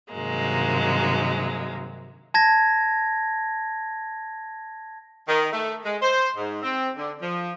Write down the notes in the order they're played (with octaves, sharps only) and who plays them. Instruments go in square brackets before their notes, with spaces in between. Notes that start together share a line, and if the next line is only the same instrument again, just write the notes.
[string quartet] G2 C3 D#3 F#3 G#3 A#3
[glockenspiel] A5 G#6 A#6
[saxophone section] D#3
A3
G#3
C5
G#2
C4
D3
F3